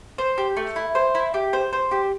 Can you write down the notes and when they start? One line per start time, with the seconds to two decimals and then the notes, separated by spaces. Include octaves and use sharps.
0.18 C5
0.38 G4
0.57 A3
0.76 E4
0.95 C5
1.15 E4
1.34 G4
1.53 C5
1.73 C5
1.91 G4